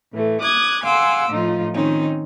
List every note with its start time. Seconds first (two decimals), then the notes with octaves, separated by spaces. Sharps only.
0.11 A2 E3 A3
0.42 D6 D#6 F#6 G#6
0.83 F5 F#5 G#5 C6 D6 E6
1.30 A2 F3 D#4 F4
1.75 D#3 C4 C#4 D#4